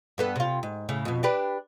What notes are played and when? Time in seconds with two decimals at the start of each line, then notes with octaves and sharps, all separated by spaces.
0.18 G2 B3 A4
0.36 C3 F4
0.63 G#2
0.89 A2 C#3
1.05 F2 B2
1.23 D4 G4 B4